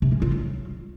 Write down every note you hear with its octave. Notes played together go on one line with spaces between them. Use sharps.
C3
G#3
F4
F#3